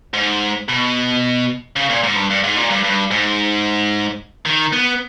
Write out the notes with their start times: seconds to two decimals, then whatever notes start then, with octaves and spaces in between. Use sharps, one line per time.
0.14 G#2
0.68 B2
1.76 C#3
1.90 A#2
2.03 G#2
2.16 G2
2.30 G2
2.44 G#2
2.57 A#2
2.71 G2
2.84 G2
3.11 G#2
4.46 D#3
4.73 B3